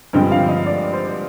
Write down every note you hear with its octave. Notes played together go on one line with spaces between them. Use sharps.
G2 D3 F3 G#3 C4 G5
F5
D#5
D5
C5